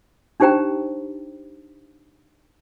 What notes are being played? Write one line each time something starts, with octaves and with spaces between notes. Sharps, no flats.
D4 D#4 G4 C5 G5 A#5